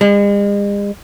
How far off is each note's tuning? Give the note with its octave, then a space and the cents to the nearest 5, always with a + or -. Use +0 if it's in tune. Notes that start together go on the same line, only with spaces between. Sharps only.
G#3 -45